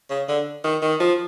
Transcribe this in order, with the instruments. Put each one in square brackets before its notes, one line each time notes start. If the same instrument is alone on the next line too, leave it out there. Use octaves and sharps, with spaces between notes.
[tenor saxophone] C#3
D3
D#3
D#3
F3